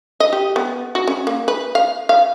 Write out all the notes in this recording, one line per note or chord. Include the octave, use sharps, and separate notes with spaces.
D#5
G4
B3
F#4
C#4
A#3
B4
F5
F5